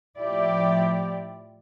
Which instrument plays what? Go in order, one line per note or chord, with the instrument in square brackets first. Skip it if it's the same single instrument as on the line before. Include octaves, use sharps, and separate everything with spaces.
[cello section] A2 F3 E4 G4 D5